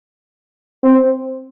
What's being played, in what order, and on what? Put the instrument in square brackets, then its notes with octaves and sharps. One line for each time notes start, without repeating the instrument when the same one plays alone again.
[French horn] C4